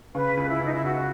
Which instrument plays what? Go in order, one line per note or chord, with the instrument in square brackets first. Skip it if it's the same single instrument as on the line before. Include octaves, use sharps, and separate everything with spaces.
[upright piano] C#3 [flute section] B4
[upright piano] C#2
[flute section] E4
[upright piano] C#2 [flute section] D#4
[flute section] E4
[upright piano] C#2 [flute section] F#4